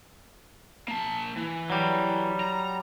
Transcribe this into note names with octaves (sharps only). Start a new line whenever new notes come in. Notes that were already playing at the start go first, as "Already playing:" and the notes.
A#3 A5
E3
F#3 G3
A#5